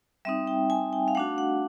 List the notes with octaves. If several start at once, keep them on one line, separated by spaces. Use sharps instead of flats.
G3 C4 D#4 E5
G5
G#5
G5
F5
A3 D4 F#4 F#5
F#5